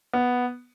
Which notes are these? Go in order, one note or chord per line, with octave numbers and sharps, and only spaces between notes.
B3